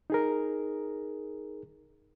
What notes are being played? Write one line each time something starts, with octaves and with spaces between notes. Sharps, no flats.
D#4 G#4 A#4